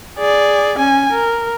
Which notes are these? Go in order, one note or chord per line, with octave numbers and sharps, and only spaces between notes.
G#4 D5
C#4 G#5
A#4